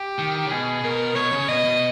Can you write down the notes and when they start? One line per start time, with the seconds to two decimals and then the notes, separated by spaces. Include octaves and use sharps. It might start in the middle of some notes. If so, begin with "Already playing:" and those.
Already playing: G4
0.18 D#3
0.46 C#3
0.51 B2 G#4
0.84 B2 A#4
1.16 B2 C#5
1.32 C#3
1.48 B2 D#5
1.65 B2